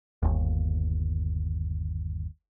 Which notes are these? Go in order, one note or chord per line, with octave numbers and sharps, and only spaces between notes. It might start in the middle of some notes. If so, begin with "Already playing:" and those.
G1 D#2